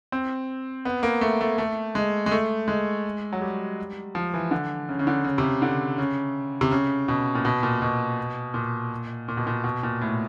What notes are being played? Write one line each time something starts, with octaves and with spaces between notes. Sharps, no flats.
C4
B3
A#3
A3
A3
A3
G#3
G#3
A3
G#3
F#3
G3
F3
E3
D3
C#3
C#3
D3
C#3
C3
C#3
D3
C#3
C3
C#3
B2
A#2
B2
A#2
B2
A#2
A#2
B2
A#2
B2
A#2
A2